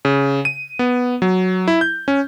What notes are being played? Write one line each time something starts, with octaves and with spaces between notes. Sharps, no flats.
C#3
D#7
B3
F#3
E4
G6
C#4